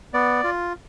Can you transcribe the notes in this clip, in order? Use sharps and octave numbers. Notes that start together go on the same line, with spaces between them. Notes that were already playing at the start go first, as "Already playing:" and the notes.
B3 D5
F4